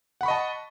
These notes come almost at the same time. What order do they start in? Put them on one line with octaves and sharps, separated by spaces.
F#5 B5 C#6 D#5 A5